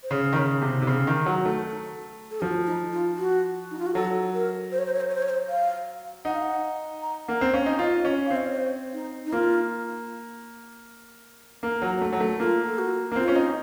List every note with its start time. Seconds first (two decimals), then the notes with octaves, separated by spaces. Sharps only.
0.03 C5
0.11 C#3 C#5
0.33 D#3
0.36 C#3 C#5
0.62 C3
0.82 C3
0.87 C#3
1.07 D#3
1.26 F#3
1.45 A3
2.31 A4
2.41 F3 F#4
2.66 D#4
2.92 F4
3.18 F#4
3.71 D#4
3.79 F4
3.86 F#4
3.95 F#3 A4
4.34 A#4
4.72 C5
4.79 C#5
4.86 C5
4.94 C#5
5.01 C5
5.08 C#5
5.15 C5
5.23 C#5
5.29 C5
5.49 F5
6.25 D#4 F#5
6.34 F5
6.42 F#5
7.02 A#5
7.27 A#3 F#5
7.41 C4
7.53 C#4 F5
7.66 D#4
7.79 F4 D#5
8.05 C#4
8.26 C4 F5
8.36 D#5
8.47 C#5
8.56 C5
8.93 D#4
9.26 D#4
9.33 A#3 F4
11.63 A#3
11.82 F#3
12.01 A3
12.12 F#3
12.20 A3
12.39 A#3 F4
12.67 A4
12.78 F#4
13.12 A#3
13.16 C4 F4
13.28 C#4
13.35 D#4